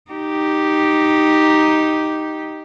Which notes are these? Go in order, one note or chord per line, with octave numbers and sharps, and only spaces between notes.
D#4 G4